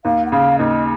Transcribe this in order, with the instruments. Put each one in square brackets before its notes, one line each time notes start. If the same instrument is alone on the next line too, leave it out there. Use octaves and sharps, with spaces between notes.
[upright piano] D#2 [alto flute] F5
[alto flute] F#5
[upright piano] C#3 [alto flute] F5
[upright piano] D#2 [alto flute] D#5